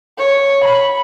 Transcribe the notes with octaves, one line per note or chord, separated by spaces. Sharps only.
C#5
B5